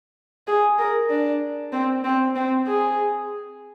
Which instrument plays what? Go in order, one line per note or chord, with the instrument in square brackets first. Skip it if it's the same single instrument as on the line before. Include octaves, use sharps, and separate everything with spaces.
[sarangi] G#4
A#4
D4
C4
C4
C4
G#4